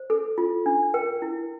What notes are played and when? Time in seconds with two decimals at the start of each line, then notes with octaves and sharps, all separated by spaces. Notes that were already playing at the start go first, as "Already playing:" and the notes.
Already playing: C5
0.10 A4
0.38 F4
0.66 D4
0.94 A#4 G5
1.22 E4